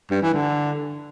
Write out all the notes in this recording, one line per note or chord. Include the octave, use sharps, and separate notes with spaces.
G2
E3
D3